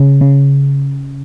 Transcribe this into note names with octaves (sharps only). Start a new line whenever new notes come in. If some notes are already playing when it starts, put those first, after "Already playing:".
Already playing: C#3
C#3